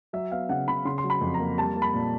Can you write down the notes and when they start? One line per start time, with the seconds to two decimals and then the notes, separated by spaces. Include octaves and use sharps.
0.13 F#3 E5
0.31 B3 F5
0.49 C#3 F#5
0.68 C#3 B5
0.85 C#3 C6
0.98 C6
1.04 F#3
1.10 B5
1.21 F2
1.34 A#5
1.40 A#3
1.57 G3 A5
1.76 A#3
1.82 B5
1.94 A#2